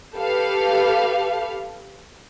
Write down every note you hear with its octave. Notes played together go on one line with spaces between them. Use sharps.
G4 A4 B4 F5